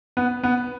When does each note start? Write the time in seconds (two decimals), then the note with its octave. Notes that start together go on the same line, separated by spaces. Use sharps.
0.17 B3
0.43 B3